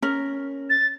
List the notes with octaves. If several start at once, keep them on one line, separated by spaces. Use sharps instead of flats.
C#4 A#4
A6